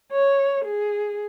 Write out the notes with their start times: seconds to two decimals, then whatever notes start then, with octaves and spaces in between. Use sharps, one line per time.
0.12 C#5
0.65 G#4